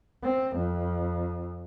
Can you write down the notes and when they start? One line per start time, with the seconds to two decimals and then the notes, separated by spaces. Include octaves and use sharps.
0.23 C4
0.56 F2